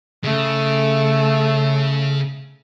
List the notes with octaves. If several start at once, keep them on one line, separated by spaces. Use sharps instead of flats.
C#3 A3